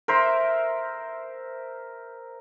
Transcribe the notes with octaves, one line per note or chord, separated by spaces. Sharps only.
A#4 C5 E5